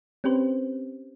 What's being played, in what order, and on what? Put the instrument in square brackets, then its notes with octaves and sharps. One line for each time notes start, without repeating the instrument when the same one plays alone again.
[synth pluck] C4 C#4 G4 B4 C5